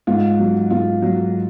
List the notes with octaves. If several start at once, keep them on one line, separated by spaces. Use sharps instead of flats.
G#2 F4
F#3
G#2 F4
F#3